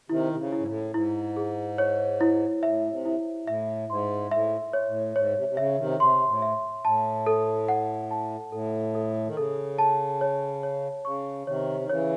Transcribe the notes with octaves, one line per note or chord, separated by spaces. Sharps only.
C3 D#3 E4
C3
C#3
E4
G#2
A2
G#2 E4
G#4
C#5
E4
A2 E5
C3
E4
A2 E5
G#2 C6
A2 E5
C#5
A2
G#2 C#5
C3
C3
C#3 E5
C3 D#3
C3 C6
A2
E5
A2 A5
A4
F#5
A5
A2 A4
A4
D#3
C#3 A4
A5
C#5
C#5
C#3 C#6
C3 D#3 C#5
D#3
C#3 E3 C#5